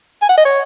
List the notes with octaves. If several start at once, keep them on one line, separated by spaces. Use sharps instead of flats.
G#5
F#5
D#5
C#5